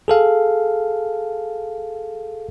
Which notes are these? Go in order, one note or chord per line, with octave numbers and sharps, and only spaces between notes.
G#4 A4 F5